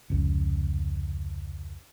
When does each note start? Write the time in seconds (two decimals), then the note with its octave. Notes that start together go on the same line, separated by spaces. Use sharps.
0.10 F1 C#2